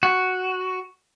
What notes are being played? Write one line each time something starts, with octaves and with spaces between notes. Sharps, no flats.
F#4